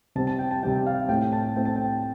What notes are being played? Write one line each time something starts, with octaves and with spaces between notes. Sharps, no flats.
C3 G3 C4 A5
A5
G5
A5
C3 G3 C4 G5
F5
A2 A3 C4 G5
A5
A2 A3 C4 G5
A5
G5